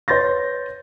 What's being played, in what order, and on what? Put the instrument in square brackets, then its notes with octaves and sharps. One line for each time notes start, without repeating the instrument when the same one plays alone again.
[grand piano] B4 C#5 C6 G6 A6 A#6